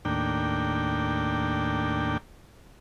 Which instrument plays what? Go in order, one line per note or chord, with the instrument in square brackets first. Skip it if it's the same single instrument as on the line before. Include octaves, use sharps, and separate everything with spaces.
[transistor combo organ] D#2 A2 A#3 D4 G5